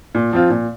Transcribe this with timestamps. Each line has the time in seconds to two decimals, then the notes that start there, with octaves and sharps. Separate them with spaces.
0.15 A#2
0.33 F3 C4 F4
0.50 A#2